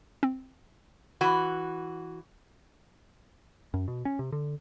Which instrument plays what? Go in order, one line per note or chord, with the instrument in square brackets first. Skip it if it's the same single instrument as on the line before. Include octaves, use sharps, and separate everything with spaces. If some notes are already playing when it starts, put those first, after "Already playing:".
[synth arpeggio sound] C4
[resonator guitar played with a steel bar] E3 F#4
[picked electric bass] F#2
B2
C#4
C3
D3